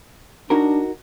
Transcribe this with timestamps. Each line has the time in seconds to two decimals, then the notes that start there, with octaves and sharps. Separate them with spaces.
0.50 D4 D#4 F#4 A#4